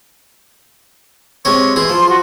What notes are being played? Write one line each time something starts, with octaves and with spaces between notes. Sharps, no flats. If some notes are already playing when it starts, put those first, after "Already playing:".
C3 G#3 C#5 C#6
E3 G#4 C6
F3
F#4